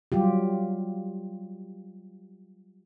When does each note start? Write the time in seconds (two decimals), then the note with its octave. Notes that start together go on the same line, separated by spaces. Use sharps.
0.12 F#3 G3 F4 G4